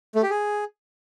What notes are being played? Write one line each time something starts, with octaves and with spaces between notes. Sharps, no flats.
A3
G4
G#4